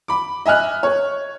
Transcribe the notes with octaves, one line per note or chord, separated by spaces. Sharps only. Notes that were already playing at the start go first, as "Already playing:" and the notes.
B5 D6
D#5 E5 G#5 F6 F#6
C#5